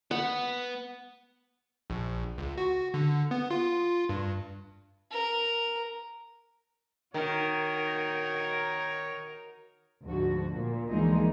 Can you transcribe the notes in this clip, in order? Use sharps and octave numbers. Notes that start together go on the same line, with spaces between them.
B3 F#5
A#1
C#2
F#4
D3
B3
F4
G2
A#4
D#3 D#4 F#4 A#4 C#5
D2 G#2 F3 F#4
A#2
D2 E3 F3 G#3 A#3 D#4